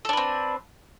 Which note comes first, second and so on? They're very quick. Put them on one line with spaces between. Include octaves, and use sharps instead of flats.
A4 D4 B4 C4